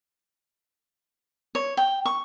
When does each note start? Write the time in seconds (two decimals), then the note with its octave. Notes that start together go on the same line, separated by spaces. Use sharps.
1.55 C#5
1.77 G5
2.06 C#6